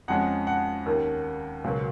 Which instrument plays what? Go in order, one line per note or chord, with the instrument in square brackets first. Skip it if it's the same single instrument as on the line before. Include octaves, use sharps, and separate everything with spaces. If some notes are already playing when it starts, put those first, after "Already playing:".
[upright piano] F2 F3 G#3 C#4 F#5
F#5
D#2 D#3 A#3 C#4
C#2 B2 F#3 A#3 C#4